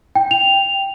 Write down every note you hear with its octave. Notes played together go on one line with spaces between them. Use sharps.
G5
F7